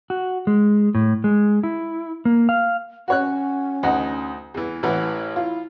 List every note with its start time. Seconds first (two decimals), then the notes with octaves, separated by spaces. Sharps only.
0.10 F#4
0.47 G#3
0.95 A2
1.24 G#3
1.63 E4
2.25 A#3
2.49 F5
3.08 C#4 F#4 C#5 F#6
3.83 D2 D#4 F#5
4.54 E2 E3
4.83 A1 E3 B4 F#5
5.36 E4 F4